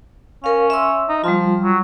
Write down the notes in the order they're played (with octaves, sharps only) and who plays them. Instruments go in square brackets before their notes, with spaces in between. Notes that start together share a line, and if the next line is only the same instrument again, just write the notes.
[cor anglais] C#4 [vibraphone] A#4 F5
[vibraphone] E5 C6 E6
[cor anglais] D#4
[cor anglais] F3 [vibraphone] G3 F4
[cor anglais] F#3